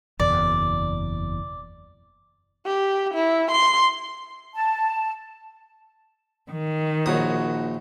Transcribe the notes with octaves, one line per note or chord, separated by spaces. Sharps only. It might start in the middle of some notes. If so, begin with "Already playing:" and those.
F#1 E2 B2 D5
G4
E4
C6
A5
D#3
A#1 D#4 F#4 C#5 D#6